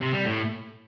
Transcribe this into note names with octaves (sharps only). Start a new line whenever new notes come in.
C3
G3
A2